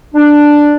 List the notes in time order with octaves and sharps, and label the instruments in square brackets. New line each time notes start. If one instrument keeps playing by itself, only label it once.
[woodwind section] D4